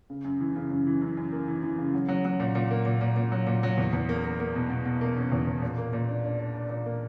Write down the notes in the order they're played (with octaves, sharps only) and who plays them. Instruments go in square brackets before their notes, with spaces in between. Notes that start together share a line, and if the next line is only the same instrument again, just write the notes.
[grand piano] C#3
F#2
E3
C#3
F#2
E3
F#2
F#2
A#3
E3
E3
C#3
F#3
F#3
F#3
A#2
A#2
A#3
A#2
A#2
A#2
F#3
A#2
F#3
E2
E2
A#3
A#3
A#3
B2
B2
B2
A#3
C#4
E2
E2
A#2
A#3
A#2
D4
D4
D4
D4
A#2
A#3